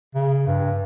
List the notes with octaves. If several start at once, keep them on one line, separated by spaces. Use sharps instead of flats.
C#3
G2